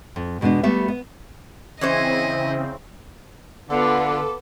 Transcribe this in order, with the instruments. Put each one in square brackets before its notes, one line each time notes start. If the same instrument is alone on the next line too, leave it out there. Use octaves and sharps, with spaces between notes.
[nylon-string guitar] F2
E2 B2 G#3 B3 D4
G3 A3 B3 G4 E5
B3
[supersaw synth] C#3 C4 [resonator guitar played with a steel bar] E3 C#4 C5 [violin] E4 D#5
[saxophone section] D3 [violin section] B3 F4 B4 [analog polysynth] A4 [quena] D6